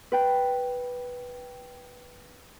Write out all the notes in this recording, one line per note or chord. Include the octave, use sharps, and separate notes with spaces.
B4 G5